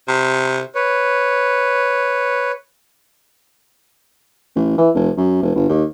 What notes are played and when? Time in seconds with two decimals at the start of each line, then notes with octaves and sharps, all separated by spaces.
0.08 C3
0.75 B4 C#5
4.55 A1
4.78 E3
4.95 F1
5.17 F#2
5.43 F1
5.55 G1
5.69 D#2